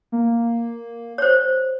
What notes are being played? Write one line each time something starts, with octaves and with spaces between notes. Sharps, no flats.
A#3
C5 C#5